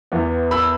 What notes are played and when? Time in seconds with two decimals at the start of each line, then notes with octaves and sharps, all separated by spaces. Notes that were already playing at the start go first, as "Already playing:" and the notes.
0.12 E2 E3 B3
0.51 B5 E6